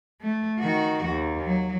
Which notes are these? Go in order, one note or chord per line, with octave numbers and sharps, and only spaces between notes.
A3
D#3 F#4
D#2
F#3